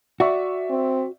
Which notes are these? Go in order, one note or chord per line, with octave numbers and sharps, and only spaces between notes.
F#4 D5 E5 C#6
C4